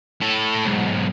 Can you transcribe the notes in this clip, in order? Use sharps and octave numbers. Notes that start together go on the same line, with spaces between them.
A2 A4
B1 G#2